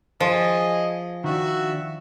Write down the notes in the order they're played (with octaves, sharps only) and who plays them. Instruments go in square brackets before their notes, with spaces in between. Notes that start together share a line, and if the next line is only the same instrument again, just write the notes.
[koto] F3 [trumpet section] G#4 D#5
[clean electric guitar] D#3 D4 [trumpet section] F#4 E5